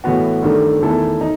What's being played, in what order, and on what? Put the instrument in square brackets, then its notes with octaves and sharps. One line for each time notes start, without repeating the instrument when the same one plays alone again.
[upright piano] A2 E3 B3 F#4
G2 D#3 A3
E2 D#3 A3 E4 A4
D#4